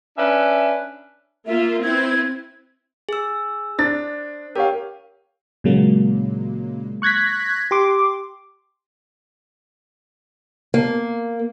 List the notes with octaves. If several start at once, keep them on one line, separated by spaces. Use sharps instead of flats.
C#4 D4 B4 E5
A#3 F4 E5
C4 E4 B4 G#6
G#4 E6
D4 C5 A6
G4 A#4 C#5 F5
A#2 C#3 F#3 G#3 A#3
C#6 F#6 G#6 A#6 B6
G4 C6 D6
A#3